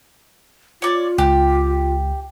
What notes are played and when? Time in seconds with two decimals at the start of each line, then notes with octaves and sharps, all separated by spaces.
0.82 F4 C#5 D5
1.18 C#2 G4